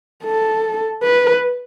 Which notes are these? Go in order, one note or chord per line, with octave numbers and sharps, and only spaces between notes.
A4
B4